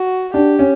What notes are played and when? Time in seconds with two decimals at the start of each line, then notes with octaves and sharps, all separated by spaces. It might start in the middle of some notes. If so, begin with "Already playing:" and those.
Already playing: F#4
0.34 D4 G4
0.59 C#4